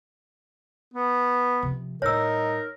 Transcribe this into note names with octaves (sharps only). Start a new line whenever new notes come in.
B3
C3 F3
A2 G3 D#4 A#4 C#5 E6